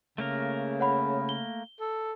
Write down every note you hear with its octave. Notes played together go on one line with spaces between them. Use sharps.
C#3 A3 A#3 A#4
C#5 F#5 B5
G7
A4